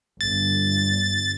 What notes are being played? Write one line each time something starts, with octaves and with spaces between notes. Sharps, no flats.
G1 A6